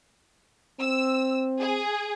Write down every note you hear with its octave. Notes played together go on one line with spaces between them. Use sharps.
C4 E6
G#4